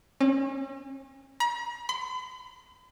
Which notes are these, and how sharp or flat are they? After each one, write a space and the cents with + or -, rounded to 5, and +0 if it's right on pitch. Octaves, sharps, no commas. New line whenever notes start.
C#4 -40
A#5 +45
B5 +45